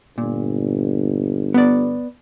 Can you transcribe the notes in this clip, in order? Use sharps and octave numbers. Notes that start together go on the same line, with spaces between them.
G1 A#2
B3 D5